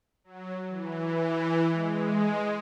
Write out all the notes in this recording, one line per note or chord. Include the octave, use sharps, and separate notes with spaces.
F#3
E3
G#3